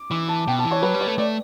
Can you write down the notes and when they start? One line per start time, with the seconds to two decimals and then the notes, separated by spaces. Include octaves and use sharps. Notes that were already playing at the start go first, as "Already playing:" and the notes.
Already playing: D6
0.11 E3 D6
0.28 A5
0.47 B2 G5
0.59 A5
0.65 E3
0.71 C#5
0.83 F#3 B4
0.94 G3
1.01 C#5
1.07 A3
1.18 A3 D5